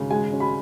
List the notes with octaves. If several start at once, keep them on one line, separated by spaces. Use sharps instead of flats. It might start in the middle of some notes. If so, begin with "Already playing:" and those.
Already playing: G#1 C#3
G#3 G#5
C#4
B5